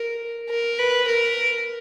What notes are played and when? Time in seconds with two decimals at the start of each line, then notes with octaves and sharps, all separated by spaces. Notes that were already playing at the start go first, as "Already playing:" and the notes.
Already playing: A#4
0.49 A#4
0.79 B4
1.07 A#4